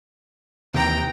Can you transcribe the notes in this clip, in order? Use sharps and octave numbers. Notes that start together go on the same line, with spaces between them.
D#2 C3 E3 G5 A#5